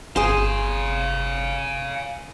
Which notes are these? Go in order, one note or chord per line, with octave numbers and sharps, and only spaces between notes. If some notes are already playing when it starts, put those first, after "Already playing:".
G1 G#4 C5 F5 G#5